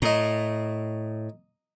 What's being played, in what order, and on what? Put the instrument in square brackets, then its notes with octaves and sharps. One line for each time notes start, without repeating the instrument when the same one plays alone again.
[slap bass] A2 [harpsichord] D#5 A#5